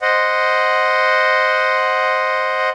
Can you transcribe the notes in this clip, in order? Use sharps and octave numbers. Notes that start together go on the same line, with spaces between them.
C5 D#5 F#5